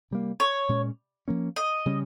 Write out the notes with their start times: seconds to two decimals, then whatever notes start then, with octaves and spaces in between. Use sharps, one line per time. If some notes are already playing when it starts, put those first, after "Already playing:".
0.11 C3 G3 A#3
0.40 C#5
0.69 A#2 G#3 C#4
1.28 F3 A#3 C#4
1.56 D#5
1.86 C#3 G3 C#4